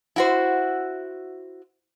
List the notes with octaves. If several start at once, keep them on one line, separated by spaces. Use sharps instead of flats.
E4 F#4 C5